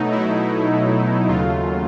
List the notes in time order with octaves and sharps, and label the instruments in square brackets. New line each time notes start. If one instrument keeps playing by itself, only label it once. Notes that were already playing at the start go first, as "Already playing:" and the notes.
Already playing: [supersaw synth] B2 F#3 A3 D#4
E4
D#2 C#3 F#3 A3 F4